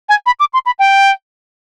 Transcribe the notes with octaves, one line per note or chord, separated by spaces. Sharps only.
G#5
B5
D6
C6
B5
G5